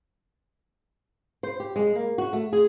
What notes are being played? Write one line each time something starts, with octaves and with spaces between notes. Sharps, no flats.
C5
G4
G#3
A#3
F#4
A3
G#4